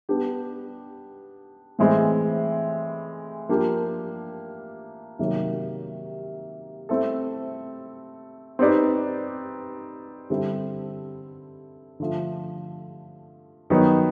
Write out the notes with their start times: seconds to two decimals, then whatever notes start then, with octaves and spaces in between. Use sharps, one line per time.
0.09 B3 D4 G4
1.79 A2 E3 G#3 C4
3.49 F3 A#3 D4 G4
5.19 C3 D#3 F#3 A#3
6.89 A3 C4 E4 A4
8.59 C4 D#4 G4 B4 D5
10.30 D3 G3 C4 E4 A4
12.00 D3 F3 A3
13.70 D#3 F#3 B3 D#4